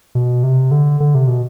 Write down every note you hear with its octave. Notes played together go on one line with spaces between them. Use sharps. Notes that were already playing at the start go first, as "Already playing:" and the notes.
B2
C3
D3
D3
C3
B2